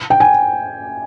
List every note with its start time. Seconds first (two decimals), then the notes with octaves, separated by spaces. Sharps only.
0.10 G5
0.20 G#5